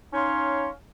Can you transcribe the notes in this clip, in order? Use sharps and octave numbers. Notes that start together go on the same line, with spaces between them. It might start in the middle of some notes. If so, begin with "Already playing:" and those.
C#4 D#4 C#5 F5 C6